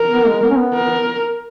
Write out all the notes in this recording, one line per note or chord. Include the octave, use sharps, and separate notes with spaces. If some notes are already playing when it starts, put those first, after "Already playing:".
Already playing: A#4
B3
G#3
B3
C#4
B3
A#4